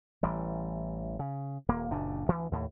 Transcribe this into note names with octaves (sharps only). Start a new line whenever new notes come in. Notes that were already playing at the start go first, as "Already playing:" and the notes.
A1 E3 G3
C#3
D#1 A#3
F#1 A#2 C#3 D4
D2 E3
D#2 A2